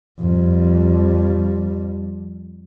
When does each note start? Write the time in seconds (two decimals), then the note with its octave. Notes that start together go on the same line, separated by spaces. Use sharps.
0.20 F2 G3